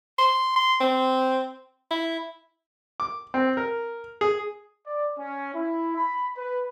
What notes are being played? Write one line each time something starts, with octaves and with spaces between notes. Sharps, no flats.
C6
C6
C4
E4
D6
C4
A#4
G#4
D5
C#4
E4
B5
B4